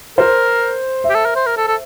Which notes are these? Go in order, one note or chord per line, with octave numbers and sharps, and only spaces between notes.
A#4 C5
E5
G4
A4
A#4
C5
A#4
A4
A4